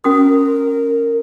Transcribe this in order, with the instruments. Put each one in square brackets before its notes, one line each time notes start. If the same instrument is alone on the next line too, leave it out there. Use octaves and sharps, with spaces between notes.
[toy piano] C#4 F#4 D#6 [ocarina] A#4